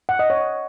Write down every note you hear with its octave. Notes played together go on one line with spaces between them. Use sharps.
F#5
D#5
C#5